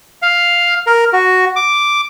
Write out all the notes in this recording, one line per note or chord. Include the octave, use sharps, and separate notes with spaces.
F5
A#4
F#4
D6